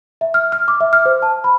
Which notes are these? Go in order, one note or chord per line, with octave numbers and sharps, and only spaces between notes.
E5
F6
F6
D6
E5
F6
C5
A5
B5